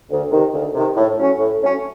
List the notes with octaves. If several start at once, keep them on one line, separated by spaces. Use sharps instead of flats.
D2
C3 D#3
D2
C3 D#3
A2
F#3 A3 C#4
A2
F#3 A3 C#4